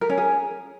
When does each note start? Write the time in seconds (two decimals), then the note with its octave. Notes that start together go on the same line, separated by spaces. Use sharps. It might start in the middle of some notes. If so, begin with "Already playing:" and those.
0.01 A#4
0.09 C#4
0.18 G#4